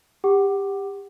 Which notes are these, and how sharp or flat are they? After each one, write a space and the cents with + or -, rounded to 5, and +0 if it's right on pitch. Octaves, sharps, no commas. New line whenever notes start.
G4 +20 F#5 +25 D6 +10